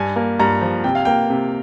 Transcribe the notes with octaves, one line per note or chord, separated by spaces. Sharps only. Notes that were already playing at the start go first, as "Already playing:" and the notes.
Already playing: G2 G#5
A#3
G2 A#5
F3
C3 G5
F5
A#3 G5
C3